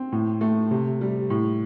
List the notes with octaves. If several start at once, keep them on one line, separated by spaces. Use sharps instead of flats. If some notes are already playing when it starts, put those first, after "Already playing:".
Already playing: C4
A2
A3
C3
G3
A2